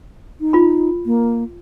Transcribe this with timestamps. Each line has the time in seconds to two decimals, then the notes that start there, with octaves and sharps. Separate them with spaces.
0.41 D#4
0.53 F4 B5
1.06 A#3